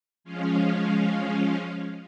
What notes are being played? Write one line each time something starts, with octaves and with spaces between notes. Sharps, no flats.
F3 G#3 C#4 F4